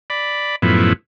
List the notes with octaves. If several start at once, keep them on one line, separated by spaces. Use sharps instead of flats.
D5 B5
F#2 A2 F3 B3 E4